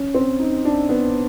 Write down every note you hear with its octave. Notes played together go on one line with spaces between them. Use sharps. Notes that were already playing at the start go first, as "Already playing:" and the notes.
Already playing: C#4
C4
D#4
D4
B3